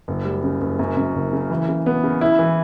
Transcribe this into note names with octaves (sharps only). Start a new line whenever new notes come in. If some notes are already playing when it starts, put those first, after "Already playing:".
F#1
G3
C#3
F#1
F#2
F#2
F#1
C#3
E3
C#3
B3
C#3
E4
E3